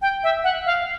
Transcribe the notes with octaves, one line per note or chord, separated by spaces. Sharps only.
G5
E5
F#5
F5